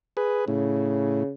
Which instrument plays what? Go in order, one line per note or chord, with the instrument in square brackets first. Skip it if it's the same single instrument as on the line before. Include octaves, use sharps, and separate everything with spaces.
[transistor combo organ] G#4 B4
[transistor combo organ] A2 [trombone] C#3